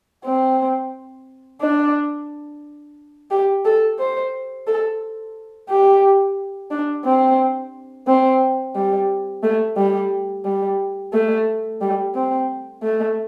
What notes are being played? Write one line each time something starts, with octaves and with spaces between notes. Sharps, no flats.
C4
D4
G4
A4
C5
A4
G4
D4
C4
C4
G3
A3
G3
G3
A3
G3
C4
A3